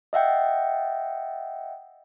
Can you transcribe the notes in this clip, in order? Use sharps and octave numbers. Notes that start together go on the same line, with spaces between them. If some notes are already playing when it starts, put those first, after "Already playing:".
D#5 E5 F#5 G5